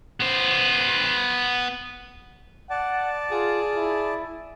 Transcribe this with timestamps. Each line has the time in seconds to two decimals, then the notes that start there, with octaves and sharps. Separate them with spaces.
0.20 B3 C5
2.70 D5 F#5 A5
3.31 F4 G#4
3.76 E4